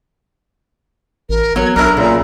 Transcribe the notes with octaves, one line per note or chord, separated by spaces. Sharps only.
A1 A#4
F#3 B3 C#5 G#6
B1 D4 E4 A#4 A#5
A#2 C#3 A#5